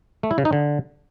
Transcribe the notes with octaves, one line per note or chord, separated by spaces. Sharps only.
A3
E4
C#3
D#4
D3